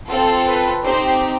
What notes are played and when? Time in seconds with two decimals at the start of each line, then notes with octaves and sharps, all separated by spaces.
0.08 C4 F4 A4
0.46 B4
0.83 C4 D#4 G4 C5